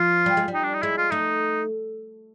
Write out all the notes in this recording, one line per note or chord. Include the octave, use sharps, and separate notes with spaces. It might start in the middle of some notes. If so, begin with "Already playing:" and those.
Already playing: F3 F4
G3
G#3
G3
D#4
D4
D#4
G#3 E4
F4
A3 D#4